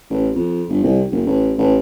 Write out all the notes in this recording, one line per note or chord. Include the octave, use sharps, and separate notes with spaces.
A1
F2
G1
C2
F#1
A1
A1